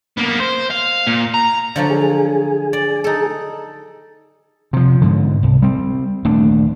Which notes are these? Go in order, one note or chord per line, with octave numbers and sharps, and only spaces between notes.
A#3 B3
C5
F5
A#2
A#5
D3 F3 F#3
G#4
D5
D#4 A4
C3 F3
G#2 D3
C2
G3 C4
D#1 A3 D4